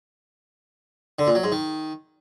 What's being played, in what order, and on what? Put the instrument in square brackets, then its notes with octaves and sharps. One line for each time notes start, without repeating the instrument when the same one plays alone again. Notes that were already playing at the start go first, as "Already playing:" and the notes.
[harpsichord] D3
A#2
F#3
G#2
D#3